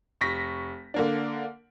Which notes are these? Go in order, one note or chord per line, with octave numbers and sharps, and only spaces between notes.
F1 C#6 A#6 B6
D3 A#3 D4